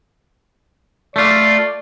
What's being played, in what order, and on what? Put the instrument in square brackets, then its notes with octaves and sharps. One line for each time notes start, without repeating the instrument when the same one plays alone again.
[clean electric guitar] A3 F4 [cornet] D5